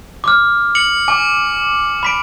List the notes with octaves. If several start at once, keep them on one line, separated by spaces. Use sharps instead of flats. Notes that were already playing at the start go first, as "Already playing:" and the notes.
D6 F6
C#7 F#7
G#5 D6
B5 B6 D7